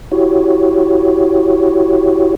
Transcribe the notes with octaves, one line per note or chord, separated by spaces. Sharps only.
E4 F#4 G4 C#5